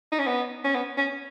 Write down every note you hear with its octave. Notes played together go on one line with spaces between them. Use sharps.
D#4
C#4
B3
C#4
B3
C#4